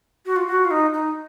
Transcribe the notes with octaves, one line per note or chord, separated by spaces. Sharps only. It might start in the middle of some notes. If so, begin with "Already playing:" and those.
F#4
F4
F#4
F4
D#4
D#4